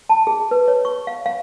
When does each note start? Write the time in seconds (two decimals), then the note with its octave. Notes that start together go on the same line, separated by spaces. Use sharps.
0.09 A5
0.27 G#4
0.51 B4
0.68 C#5
0.85 C#6
1.07 F5
1.26 F5